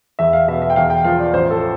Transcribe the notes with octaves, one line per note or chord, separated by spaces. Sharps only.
E2 E5
F5
B2 E5
E5
G5
E2 F5
G5
F3 F5
D5
A1 C5
A4